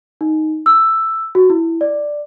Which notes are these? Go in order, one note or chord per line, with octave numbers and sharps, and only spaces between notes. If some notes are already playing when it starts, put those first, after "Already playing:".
D#4
E6
F#4
E4
D5